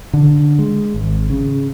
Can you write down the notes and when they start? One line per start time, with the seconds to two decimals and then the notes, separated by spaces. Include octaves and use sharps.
0.13 D3
0.59 G#3
0.94 G#1
1.30 C#3